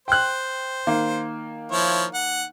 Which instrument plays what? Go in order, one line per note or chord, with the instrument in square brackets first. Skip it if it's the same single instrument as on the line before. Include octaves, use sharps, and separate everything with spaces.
[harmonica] C5 [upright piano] G5 F#6
[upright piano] D#3 A#3
[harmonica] F3 E4 C#5
F#5